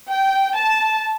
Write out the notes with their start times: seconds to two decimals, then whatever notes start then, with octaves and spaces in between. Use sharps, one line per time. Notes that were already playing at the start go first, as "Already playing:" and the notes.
0.10 G5
0.56 A5